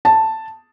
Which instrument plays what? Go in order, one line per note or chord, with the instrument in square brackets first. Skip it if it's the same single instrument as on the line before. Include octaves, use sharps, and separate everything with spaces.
[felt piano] A5